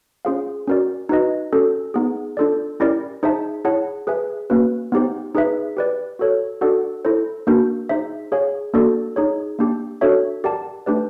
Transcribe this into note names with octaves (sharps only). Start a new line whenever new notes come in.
C#4 F4 G#4 C5 F5
C#4 F#4 A#4 D5
D#4 F#4 B4 D#5
C#4 F#4 A4
B3 D#4 G#4
D4 F4 A4 D5
C#4 E4 G4 A#4 D5
D#4 G#4 C5 E5 A5
E4 G#4 C#5 F#5 A5
G#4 B4 E5 G#5
A#3 C#4 F#4 B4
B3 D#4 G4 C5
D#4 G#4 B4 E5
G4 B4 D5
F#4 A4 C#5
D4 F#4 A4 D5 F#5
E4 A4 C5
A#3 D4 F#4 A#4
D#4 G#4 C5 E5
G#4 C#5 F5 G#5
A#3 D4 F#4 A4 D5
D#4 G#4 C#5
A#3 D4 G4
D4 F#4 A4 C#5 E5
G4 A#4 D5 F#5 A5
A3 D4 G4 B4 D5